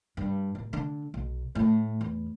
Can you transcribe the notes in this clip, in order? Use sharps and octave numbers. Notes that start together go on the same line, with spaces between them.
G2
D1
D3
B1
A2
E2